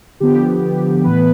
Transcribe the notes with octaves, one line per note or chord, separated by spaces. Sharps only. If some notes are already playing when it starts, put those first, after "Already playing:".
D3 F3 B3 G4
A2 E3 B3 B4